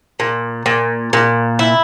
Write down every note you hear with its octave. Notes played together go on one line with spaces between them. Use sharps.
A#2
A#2
A#2
E4